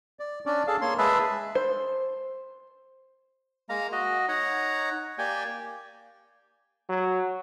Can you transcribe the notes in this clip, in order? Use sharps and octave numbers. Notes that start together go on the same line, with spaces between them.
D5
C#4 D4 D5
G#4 A4 F5 A5
A#3 C#5 C6
G#3 G#4 B4 E5 A5 B5
C5
G#3 A#3 F5 A#5
F#4 D#5
D#4 C#5 F#5 A#5
A#3 G4 D5 G5 G#5
F#3